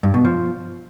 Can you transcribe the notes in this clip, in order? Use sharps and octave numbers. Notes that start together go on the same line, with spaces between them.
G2
B2
F3